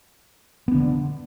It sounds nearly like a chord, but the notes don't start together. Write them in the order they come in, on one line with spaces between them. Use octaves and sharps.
B3 D4 D3